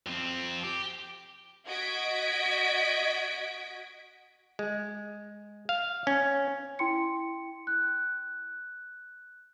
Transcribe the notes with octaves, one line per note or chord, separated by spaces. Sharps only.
F2 C4
G4
F#4 D#5 G#6 B6 D7
G#3
F5
C#4
E4 G5 C6 C#7
F#6